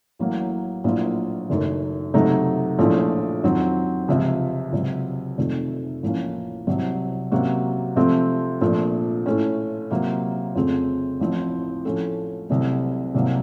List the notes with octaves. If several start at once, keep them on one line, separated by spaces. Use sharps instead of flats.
A1 A2 F#3 A#3
A#1 A2 F#3 A#3 F4
F#1 F#2 D#3 A3
C#2 C3 F#3 A3 D#4
A#1 A2 F3 A3 C#4
F2 D#3 F#3 C4
C#2 C3 F3
C#2 C3 F#3
F1 F2 D#3 A3
A1 A2 F3 A#3 C#4
C2 C3 F#3
C3 F#3 A#3 C#4 F#4
C3 F3 A3 C4
A#1 A#2 F3 A3
A2 A3 C#4
C3 F#3 A#3 F4
F2 C#3 A3 C4
A1 A2 F3 C4
A2 F3 A3 C#4 A4
C2 C3 F#3 A3
C2 C3 F#3 A#3